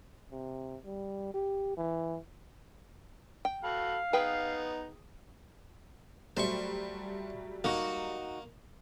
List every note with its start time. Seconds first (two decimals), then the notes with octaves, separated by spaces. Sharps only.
0.32 C3
0.85 G3
1.34 G4
1.77 E3
3.45 G5
3.64 F#4 A4 F5 B5
4.13 B3 D#4 G#4 B4 G5
6.37 F#3 G3 A3 C5 C#6
7.64 A#3 D#4 F#4